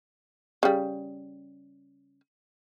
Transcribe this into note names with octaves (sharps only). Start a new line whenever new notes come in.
C#3 G3